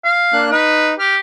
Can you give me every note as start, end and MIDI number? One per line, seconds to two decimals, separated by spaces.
0.05 0.42 77
0.33 0.50 58
0.33 0.50 62
0.33 0.50 90
0.51 0.94 63
0.51 0.93 71
0.99 1.18 67
0.99 1.15 89